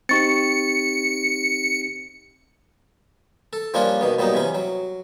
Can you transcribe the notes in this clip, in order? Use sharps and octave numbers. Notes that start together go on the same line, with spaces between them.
C4 D#4 G4 C#6 A6 C#7
A4
F3 G3 A#3 C#4 D4 F4
B2 D#3 B3
A#2 F#3 G3 B3 D#4
C3 E3 C#4
F#3